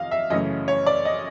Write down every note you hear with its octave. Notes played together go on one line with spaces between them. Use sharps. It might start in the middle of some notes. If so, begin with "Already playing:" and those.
Already playing: F2 C3 D#3 D#5 F5
E5
F#2 C#3 E3 A3 C#4 D#5
C#5
D5
D#5